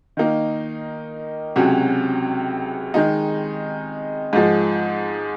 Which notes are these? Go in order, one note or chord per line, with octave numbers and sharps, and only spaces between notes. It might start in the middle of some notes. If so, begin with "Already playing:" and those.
D#3 A#3 D#4
C#2 C3 F#3 C#4 F#4
D#3 G#3 D#4
G#2 F3 G#3